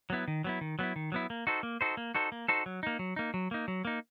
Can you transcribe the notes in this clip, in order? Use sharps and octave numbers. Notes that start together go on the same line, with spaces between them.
F#3 B3 E4
D#3
F#3 B3 E4
D#3
F#3 B3 E4
D#3
F#3 B3 E4
A#3
D#4 F#4 A4 C5
A#3
D#4 F#4 A4 C5
A#3
D#4 F#4 A4 C5
A#3
D#4 F#4 A4 C5
F#3
A#3 D#4
F#3
A#3 D#4
F#3
A#3 D#4
F#3
A#3 D#4